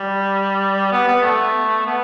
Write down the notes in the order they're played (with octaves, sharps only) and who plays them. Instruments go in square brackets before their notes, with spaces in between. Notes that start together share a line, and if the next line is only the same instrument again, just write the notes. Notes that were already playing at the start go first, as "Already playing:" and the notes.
Already playing: [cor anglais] G3
B3
B3
A3
B3